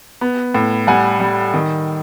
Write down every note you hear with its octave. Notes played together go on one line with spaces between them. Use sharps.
B3
A2
G3 F#5 G#5
G3
D#3